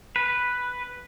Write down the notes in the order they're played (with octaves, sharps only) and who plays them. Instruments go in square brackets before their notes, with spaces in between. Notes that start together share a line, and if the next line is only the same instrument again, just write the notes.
[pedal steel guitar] B4